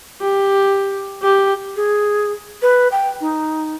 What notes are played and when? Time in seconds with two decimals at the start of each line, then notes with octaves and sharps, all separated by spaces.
0.21 G4
1.22 G4
1.76 G#4
2.62 B4
2.92 G5
3.21 D#4